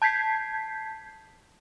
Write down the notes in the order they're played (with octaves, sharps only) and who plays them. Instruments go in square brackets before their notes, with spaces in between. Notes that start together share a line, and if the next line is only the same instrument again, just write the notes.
[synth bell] A5 G6 G#6 B6 C7